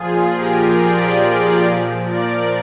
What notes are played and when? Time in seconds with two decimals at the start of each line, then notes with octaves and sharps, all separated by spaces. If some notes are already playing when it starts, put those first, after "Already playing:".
Already playing: A#2 F3 F4 G#4
0.31 G4 A#4
0.74 A#4 D5
1.60 A#2 F3
2.04 A#4 D5